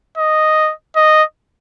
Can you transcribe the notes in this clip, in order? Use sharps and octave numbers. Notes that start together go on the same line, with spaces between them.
D#5
D#5